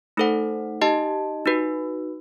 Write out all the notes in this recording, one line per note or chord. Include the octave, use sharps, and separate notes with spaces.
A3 D#4 A4 C5 F#5
D#4 G4 D#5 A5
D#4 F#4 B4